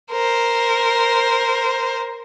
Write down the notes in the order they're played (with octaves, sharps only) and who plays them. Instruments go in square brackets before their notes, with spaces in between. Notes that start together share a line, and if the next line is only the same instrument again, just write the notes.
[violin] A#4 C5